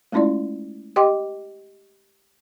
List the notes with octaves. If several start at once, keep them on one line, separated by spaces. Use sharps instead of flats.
G#3 A3 C#4 E4 F4 D5
G4 D#5 G5 C6 D6